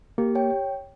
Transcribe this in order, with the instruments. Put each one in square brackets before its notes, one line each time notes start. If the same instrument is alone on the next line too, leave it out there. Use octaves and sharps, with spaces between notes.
[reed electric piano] A#3 [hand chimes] G4
[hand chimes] C#5 G5